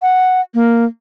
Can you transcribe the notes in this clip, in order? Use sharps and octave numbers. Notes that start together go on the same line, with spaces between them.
F#5
A#3